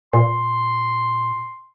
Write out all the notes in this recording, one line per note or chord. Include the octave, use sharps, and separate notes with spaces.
A#2 C6